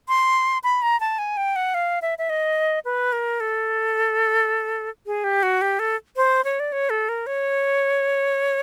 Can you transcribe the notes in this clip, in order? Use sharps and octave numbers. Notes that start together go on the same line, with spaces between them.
C6
B5
A#5
A5
G#5
G5
F#5
F5
E5
E5
D#5
B4
A#4
A4
G#4
G4
F#4
G4
A4
C5
C#5
D5
C#5
A4
A#4
C#5